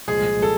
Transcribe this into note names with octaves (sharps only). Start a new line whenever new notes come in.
C2 A#2 F3 G#3 G#4
A4